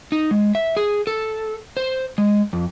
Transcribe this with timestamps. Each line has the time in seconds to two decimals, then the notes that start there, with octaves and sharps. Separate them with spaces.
0.12 D#4
0.31 G#3
0.55 E5
0.77 G#4
1.07 A4
1.77 C5
2.18 G#3
2.53 F2